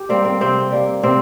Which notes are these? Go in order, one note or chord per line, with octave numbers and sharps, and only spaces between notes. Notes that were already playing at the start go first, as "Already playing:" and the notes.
Already playing: G4
G3 A#3 C4
C4
C3 C4
G3 A#3
C3 C4